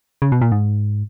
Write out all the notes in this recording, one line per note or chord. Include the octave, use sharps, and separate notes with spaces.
C#3
B2
A#2
G#2